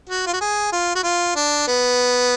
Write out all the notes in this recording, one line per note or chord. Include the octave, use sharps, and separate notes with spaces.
F#4
F4
F#4
G#4
F4
F#4
F4
D4
B3